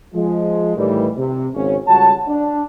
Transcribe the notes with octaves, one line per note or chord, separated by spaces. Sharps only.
F3 G#3
A2 D#3 E3 G3
C3
G#1 C#3 C#4
C#2 G3 F#4 C#5 A5
D4